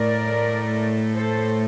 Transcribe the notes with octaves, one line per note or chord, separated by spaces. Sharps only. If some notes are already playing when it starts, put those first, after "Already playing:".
Already playing: A2 A3 A#4 D5
A4 C5